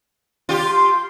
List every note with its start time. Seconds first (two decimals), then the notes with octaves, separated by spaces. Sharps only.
0.49 F4 G4
0.65 C6